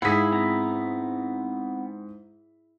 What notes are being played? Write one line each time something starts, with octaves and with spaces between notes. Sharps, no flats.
G#2 E4 G#4 F5 F#5 B6
B3 C4 A#5